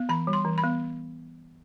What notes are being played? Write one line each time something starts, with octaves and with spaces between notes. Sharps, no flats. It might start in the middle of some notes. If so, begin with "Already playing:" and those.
Already playing: B3
E3 B5
G3
C6
E3
B5
B3